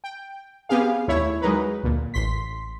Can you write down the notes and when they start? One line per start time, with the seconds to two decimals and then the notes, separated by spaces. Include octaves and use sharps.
0.04 G5
0.69 B3 C4 G4 G#4 F5
1.08 D#2 A3 E4 C#5
1.41 F#3 G#3 D#4 A#4 B4
1.83 D2 A#2
2.14 A1 C6 B6